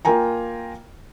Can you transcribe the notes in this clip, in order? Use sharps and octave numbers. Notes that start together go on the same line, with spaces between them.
A#3 F4 A#4 G5 G#5 A#5